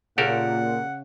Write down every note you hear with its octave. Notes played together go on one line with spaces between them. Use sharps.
A#2 C#3 G4 A4 A#4 F#5